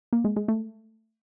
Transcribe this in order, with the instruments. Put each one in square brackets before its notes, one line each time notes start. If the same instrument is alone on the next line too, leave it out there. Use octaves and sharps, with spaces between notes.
[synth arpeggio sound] A#3
G#3
G#3
A3